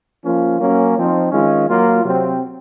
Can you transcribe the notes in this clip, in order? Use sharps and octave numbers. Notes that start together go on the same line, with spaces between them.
F3 A#3 C#4 F4
F#3 A#3 C#4
F3 C4 D#4
D#3 G#3 C#4 F4
F#3 A#3 F4
C3 F#3 C4